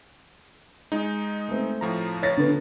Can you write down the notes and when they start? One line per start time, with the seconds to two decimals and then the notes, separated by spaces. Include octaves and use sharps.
0.92 G#3 D#4
1.48 A3 C4
1.81 A2 F3 A#5
2.23 C#5 A6 A#6
2.38 D3 B3